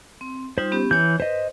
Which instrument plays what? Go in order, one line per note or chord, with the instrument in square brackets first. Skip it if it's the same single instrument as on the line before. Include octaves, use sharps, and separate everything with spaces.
[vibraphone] C4
[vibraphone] G3 D#4 F4 [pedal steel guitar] C5
[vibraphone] B3 C#4 G4
[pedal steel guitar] E3 G6 [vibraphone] C#5 G#5
[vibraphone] B4 [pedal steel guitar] C5 D#5